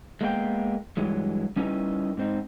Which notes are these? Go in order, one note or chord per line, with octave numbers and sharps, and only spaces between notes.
G#3 A#3 B3 D4 G5
G2 E3 F#3 G#3
G3 C#4 D#4 E4 A#4 B4
G#2 C4 D#4